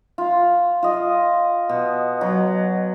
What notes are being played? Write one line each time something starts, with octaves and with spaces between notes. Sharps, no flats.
F4
F4 D#5
B2
F#3